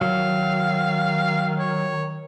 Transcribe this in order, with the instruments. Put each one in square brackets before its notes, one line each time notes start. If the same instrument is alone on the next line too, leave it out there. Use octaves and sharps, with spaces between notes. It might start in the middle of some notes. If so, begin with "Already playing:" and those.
[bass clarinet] D#3 [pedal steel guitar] F#3 [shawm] F5
[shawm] C#5